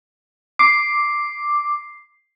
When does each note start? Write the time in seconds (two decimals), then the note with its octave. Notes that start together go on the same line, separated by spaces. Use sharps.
0.59 D6 C7